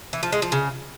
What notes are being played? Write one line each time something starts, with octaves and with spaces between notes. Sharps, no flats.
E3
F3
G#3
F3
C#3